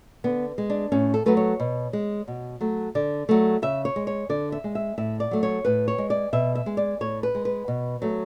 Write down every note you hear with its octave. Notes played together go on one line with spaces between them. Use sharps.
D3 B3
G#3
D4
A2 C#4
A4
F#3 A3 B4
C#5
B2
G#3
B2
F#3 A3
D3 D5
F#3 A3
C#3 E5
C#5
G#3
C#5
D3 D5
E5
G#3
E5
A2 E5
D5
F#3 A3
C#5
A2 B4
C#5
G#3
D5
B2 E5
E5
G#3
D5
A2 C#5
B4
G#3
B4
B2
F#3 A3